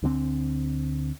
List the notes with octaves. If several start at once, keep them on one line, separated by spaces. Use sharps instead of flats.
D2 D3 E3 C4